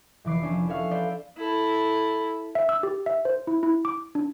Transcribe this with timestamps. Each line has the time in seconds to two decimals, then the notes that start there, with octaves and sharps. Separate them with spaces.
0.24 F1 E3 D6 C7
0.43 F3 C#4 D4
0.68 A4 C#5 E5 F5 F#6
0.91 B4 C5 D5
1.38 E4 A4
2.55 E5
2.69 E6
2.83 G4
3.06 E5
3.25 C5
3.47 E4
3.63 E4
3.85 D6
4.15 D4